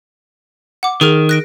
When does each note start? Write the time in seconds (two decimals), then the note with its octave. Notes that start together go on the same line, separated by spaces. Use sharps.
0.83 F#5 D6
1.01 D#3 G#4 A#4 F6
1.29 F#6 A#6 D7